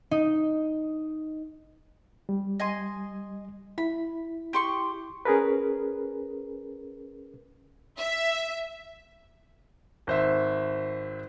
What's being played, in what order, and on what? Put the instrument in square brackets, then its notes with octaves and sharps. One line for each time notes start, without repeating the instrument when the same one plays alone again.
[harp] D#4
[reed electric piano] G3
[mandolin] D#5 G#5 C6
[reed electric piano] E4 [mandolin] B5
[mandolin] G4 C6 C#6
[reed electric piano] C#4 G#4 A#4 B4
[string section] E5
[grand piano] G#1 C5 E5